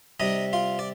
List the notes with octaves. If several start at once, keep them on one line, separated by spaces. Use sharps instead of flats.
C3 G3 D#4 D#5
F4 F5
D5